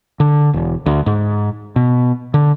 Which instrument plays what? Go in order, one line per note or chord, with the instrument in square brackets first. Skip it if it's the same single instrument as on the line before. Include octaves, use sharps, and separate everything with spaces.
[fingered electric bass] D3
E1
D2
G#2
B2
D3